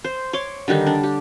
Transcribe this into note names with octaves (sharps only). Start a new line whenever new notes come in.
C5
C#5 C6 D6
D3 D#3 G3 D#4
D4
G4